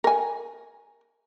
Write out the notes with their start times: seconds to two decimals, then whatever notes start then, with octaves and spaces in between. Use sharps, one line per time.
0.04 A#4 G#5